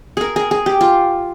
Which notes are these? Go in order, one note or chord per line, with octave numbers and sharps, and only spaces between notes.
G#4 A#4
G#4
G#4
G4
F4